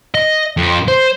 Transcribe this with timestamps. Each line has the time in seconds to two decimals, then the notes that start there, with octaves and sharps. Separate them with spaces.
0.15 D#5
0.57 F2
0.88 C5